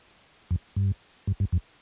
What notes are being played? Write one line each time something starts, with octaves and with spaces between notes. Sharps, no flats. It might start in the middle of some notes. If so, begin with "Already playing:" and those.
F2
G2
G2
G2
F2